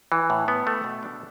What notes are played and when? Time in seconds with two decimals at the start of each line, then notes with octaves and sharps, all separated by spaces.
0.12 E3
0.30 A2
0.48 B3
0.67 A3
0.84 B2
1.03 D4